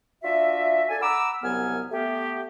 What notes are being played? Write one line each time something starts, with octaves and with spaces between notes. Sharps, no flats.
D4 F4 F#4 E5
D4 A4 G#5
F#5 A#5 B5 D6 E6
C2 F#2 F#3 B3 G#5 F6
A3 B3 G4